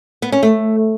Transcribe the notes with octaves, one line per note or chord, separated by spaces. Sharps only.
B3
C#4
A3